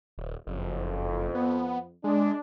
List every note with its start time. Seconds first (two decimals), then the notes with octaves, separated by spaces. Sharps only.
0.18 D#1
0.47 F#1 F2
1.35 B3
2.04 G#3 D4